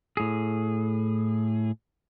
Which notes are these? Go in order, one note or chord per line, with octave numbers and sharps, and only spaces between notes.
A2 G#4